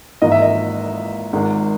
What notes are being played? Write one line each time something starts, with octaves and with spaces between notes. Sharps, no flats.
G#1 G#2 E3 A#3 D#5
E5
D#5
G#1 G#2 D#3 G#3